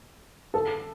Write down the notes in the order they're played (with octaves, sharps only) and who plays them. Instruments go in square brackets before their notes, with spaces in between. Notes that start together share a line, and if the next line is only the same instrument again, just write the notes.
[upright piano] A4